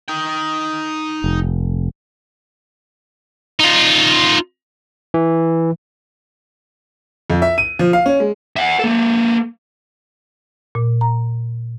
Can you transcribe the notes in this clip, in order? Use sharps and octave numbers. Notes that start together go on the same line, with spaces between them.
D#4 G5
F1
D#4 F4
E3
F2
E5
D#7
F3
F5
C#4
G#3
E5 F#5
A#3 A4
A#2
A#5